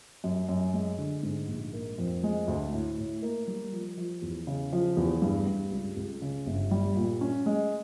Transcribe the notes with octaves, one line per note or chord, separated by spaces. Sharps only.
F#2
F#2
G#3
D3
G#2
A#1
A#3
F2
G#3
D2
A2
A2
A#3
G3
F3
F3
E2
C#3
F3
E2
G2
G2
C#2
C#2
C#3
G1
G3
A#2
C#4
G#3